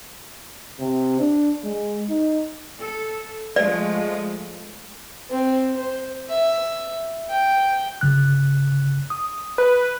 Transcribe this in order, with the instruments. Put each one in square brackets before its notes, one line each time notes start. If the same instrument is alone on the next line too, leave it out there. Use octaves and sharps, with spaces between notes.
[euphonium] C3
D4
G#3
D#4
[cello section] A4
[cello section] F3 G#3 A3 [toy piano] D5
[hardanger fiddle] C4
C5
E5
G5
[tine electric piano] G1 C#3 F#6
D#6
[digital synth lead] B4